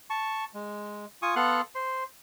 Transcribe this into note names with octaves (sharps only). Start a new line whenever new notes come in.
A5 C#6
G#3
F4 G#5 C#6 D#6
B3 A4 F5 F#5 C6 F#6
C5 C6